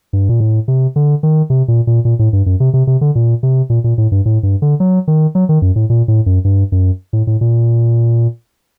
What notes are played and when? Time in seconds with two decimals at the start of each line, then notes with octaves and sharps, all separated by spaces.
0.13 G2
0.29 A#2
0.40 A2
0.68 C3
0.96 D3
1.23 D#3
1.50 C3
1.68 A#2
1.87 A#2
2.05 A#2
2.19 A2
2.33 G2
2.46 F#2
2.60 C3
2.74 C3
2.87 C3
3.01 D3
3.15 A#2
3.43 C3
3.70 A#2
3.84 A#2
3.98 A2
4.12 G2
4.26 A2
4.43 G2
4.62 D3
4.80 F#3
5.08 D#3
5.35 F#3
5.49 D#3
5.62 F#2
5.76 A2
5.90 A#2
6.08 A2
6.26 F#2
6.45 G2
6.72 F#2
7.13 A2
7.27 A2
7.41 A#2